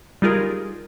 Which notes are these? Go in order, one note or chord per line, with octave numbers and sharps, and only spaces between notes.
G3 D#4 F4 G#4 A#4